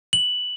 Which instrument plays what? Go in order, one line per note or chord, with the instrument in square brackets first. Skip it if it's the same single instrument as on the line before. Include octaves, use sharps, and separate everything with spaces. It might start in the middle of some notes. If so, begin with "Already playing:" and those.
[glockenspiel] F#7